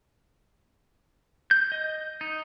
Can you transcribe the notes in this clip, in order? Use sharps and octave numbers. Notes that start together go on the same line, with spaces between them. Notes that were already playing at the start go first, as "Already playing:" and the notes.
G6
D#5
D#4